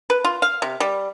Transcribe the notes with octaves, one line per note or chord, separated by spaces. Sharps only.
B4
F4
F5
C3
G3